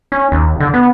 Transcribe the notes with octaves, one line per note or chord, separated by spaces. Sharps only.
C#4
D#2
D3
B3